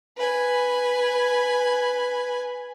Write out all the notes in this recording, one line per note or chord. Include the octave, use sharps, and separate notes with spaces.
B4 G#5